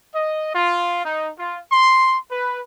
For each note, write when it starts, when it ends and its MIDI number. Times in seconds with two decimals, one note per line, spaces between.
0.15 0.54 75
0.55 1.02 65
1.05 1.30 63
1.39 1.60 65
1.72 2.19 84
2.31 2.61 71